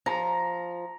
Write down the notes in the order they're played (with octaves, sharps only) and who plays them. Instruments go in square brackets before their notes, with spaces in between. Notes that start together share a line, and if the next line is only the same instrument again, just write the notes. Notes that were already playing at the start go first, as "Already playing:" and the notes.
[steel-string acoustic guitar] F3 [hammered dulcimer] A#5